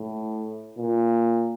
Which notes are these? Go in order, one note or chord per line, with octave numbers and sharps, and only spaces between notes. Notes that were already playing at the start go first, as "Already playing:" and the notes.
Already playing: A2
A#2